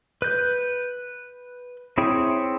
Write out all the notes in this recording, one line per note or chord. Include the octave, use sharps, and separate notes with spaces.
B4 G6
C4 E4 G#4 C#5 G5